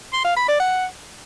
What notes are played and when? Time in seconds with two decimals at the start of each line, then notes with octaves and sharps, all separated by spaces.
0.13 C6
0.25 F5
0.37 B5
0.48 D5
0.60 F#5